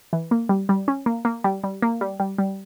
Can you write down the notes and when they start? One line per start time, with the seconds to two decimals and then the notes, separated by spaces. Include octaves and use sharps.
0.13 E3
0.31 A#3
0.49 G3
0.69 G3
0.88 C#4
1.06 A#3
1.25 A#3
1.44 G3
1.64 G3
1.82 A#3
2.01 G3
2.20 G3
2.38 G3